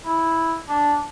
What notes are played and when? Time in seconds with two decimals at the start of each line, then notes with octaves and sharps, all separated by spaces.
0.06 E4
0.69 D4